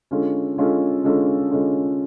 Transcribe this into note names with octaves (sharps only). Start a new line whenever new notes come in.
D3 G#3 C#4 F4 A4
D3 G#3 C#4 F4 A4
D3 G#3 C#4 F4 A4
D3 G#3 C#4 F4 A4